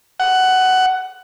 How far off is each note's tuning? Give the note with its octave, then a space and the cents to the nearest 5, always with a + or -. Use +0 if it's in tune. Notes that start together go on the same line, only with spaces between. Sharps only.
F#5 +10